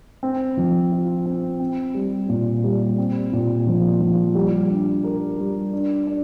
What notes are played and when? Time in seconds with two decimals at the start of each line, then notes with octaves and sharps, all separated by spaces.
0.23 C4
0.57 F3
0.92 F4
1.26 C4
1.60 C4
1.94 G3
2.29 A#2
2.64 G3
2.98 C4
3.32 A#2
3.67 F3
4.01 F3
4.35 G3
4.70 D4
5.04 A#4
5.38 G3
5.73 D4
6.07 D4